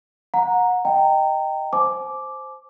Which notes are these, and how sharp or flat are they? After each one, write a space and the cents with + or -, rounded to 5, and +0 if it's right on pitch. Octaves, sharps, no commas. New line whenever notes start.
F#5 -30 A#5 +0
D#5 +0 G5 +0 A#5 -25
C5 +0 G#5 +45 D6 +0